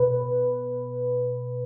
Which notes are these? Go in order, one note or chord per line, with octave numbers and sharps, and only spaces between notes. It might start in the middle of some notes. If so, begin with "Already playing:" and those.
Already playing: B2 B4